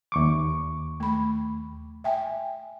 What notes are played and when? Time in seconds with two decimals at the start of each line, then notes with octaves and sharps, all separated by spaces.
0.12 D#2 C#6 D6
1.00 A3 B5
2.04 E5 G5 G#5